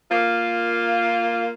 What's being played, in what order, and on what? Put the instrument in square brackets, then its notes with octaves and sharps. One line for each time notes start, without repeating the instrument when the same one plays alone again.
[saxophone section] A#3 F4